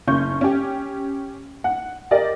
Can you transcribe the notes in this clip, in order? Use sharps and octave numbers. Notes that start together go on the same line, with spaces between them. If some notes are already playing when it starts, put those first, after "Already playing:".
F#1 C#4 C#6 G6
C#4 G4
F#5
G4 A#4 D5 D#5